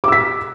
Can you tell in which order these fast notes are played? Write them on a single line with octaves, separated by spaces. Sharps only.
D6 E6 B6